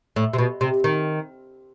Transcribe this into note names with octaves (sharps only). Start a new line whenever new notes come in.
A2
C3
B2
C3
D#3